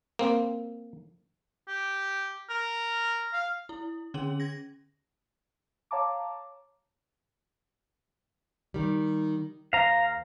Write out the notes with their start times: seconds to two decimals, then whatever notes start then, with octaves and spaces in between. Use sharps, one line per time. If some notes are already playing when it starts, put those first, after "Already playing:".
0.19 A#3 C4
1.68 G4
2.50 A#4
3.33 F5
3.69 E4
4.14 D3 C#4 G#4 F#7
4.40 G#6 A#6
5.91 C#5 F5 A5 A#5 D6
8.74 D#3 G3
9.73 D#2 C5 F5 A#5